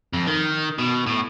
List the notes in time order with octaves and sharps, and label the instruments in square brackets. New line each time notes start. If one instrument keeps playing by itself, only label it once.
[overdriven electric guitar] F2
D#3
B2
A2